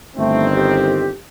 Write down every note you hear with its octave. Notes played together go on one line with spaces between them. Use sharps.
G1 D#3 A3 C4
G4